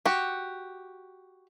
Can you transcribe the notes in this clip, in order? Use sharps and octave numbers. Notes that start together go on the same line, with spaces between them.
F#4 G4